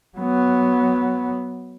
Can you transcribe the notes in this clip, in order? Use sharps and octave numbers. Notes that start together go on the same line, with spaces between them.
F#3 B3